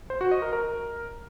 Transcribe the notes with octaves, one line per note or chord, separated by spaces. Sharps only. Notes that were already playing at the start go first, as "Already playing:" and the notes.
C5
F#4
D#5
A#4
A#4